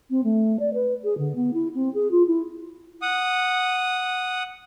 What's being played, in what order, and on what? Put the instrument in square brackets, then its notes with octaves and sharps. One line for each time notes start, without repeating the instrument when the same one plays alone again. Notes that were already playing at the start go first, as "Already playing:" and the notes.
[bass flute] C4
A3
D5
B4
G#4
D3
B3
E4
C4
G#4
F4
E4
[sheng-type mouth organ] F#5 D#6